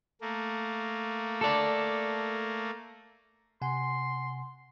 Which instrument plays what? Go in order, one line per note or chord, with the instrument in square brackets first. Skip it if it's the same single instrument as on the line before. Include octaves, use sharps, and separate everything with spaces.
[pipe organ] A3 A#3
[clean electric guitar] A4 D5
[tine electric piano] C3 F#5 G#5 [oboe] C6